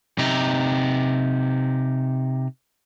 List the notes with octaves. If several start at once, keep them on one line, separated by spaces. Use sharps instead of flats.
C3 D#4